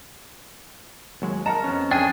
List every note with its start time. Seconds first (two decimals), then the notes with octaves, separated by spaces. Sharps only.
1.22 D#2 F#3 G#3
1.46 A#4 D#5 F#5 A5 A#5
1.64 F2 B3 C#4
1.91 D4 G#4 G5